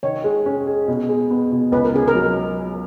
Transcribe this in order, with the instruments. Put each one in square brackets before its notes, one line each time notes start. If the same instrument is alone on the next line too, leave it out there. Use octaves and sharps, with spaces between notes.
[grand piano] D#3 [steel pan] C#5
[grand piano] G#3
C#4
G#4
B2
G#3
B3
B2
[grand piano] C#2 [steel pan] B4
[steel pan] A#4
[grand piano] C#3 [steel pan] G#4
[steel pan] A#4
[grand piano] F#3